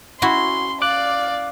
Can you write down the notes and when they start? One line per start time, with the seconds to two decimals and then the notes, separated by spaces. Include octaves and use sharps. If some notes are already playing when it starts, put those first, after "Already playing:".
0.22 C#4 E4 F#4 C6
0.82 D5 F5 D6 F#6